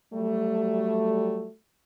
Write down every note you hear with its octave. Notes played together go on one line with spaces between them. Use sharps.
F#3 G3 A3